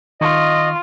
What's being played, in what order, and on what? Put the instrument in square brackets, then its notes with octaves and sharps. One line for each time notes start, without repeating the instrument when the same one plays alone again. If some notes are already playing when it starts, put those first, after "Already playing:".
[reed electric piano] D#3 C#6 [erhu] F4 [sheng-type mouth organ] D#5